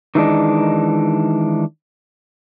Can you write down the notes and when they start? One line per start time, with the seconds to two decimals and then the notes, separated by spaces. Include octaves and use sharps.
0.15 D#3 E3 G#3 D4 D#4